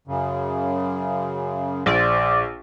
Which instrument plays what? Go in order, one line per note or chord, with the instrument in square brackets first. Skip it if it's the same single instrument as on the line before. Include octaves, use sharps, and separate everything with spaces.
[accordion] F#2 C#3
[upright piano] A#1 [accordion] C5 [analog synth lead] D5